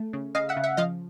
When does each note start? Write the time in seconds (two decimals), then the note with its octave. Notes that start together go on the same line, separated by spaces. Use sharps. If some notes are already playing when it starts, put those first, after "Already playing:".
Already playing: A3
0.13 C#3
0.35 C#3 D#5 F5
0.49 E5 F#5
0.57 C#3
0.64 E5 F#5
0.77 F3 D#5 F5